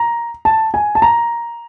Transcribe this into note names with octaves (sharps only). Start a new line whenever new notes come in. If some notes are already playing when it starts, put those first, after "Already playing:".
Already playing: A#5
A5
G#5
A5
A#5